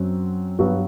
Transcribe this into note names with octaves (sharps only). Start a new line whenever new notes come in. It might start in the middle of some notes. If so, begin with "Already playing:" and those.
Already playing: F#2 F#3 C4
G2 F#3 B3 F#4